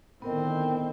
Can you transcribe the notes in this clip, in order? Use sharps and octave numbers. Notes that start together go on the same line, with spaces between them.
A2 D3 D#3 B3 C4 A#4 D#5